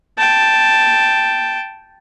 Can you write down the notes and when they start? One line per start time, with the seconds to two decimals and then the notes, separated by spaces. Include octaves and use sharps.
0.18 G5 A5